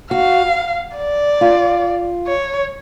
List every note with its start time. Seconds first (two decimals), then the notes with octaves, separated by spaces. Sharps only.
0.11 F#4 F5
0.97 D5
1.41 F4
2.27 C#5